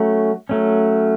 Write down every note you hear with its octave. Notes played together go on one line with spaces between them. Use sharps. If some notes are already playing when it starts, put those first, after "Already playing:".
Already playing: F#3 A3 C#4
F#3 A3 C#4